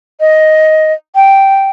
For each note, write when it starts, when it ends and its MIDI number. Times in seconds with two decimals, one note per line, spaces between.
0.20 0.93 75
1.15 1.70 79